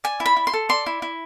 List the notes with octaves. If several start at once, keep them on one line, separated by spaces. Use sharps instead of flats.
D5 G#5
E4
B5
E4
C6
A4
D5 C6
E4
E4